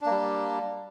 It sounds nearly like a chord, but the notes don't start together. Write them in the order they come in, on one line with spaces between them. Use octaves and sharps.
D4 A#3 G3